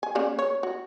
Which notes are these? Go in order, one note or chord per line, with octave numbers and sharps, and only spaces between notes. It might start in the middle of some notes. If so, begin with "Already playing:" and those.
G#5
C#3 A#3 D5
C#5
F#4